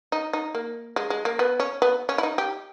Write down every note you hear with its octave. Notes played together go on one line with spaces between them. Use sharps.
D#4
D#4
A#3
G#3
G#3
A#3
B3
C#4
B3
C#4
E4
D#4
G4